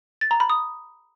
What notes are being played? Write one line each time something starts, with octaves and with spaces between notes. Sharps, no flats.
A6
A#5
B5
D#6